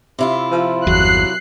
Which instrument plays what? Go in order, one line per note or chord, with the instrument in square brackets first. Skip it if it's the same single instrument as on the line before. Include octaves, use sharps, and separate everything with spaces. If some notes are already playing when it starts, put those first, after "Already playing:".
[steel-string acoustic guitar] C3 E4 F4
[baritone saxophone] F3
[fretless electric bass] G1 E2 [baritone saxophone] F#3 [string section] F#6 C7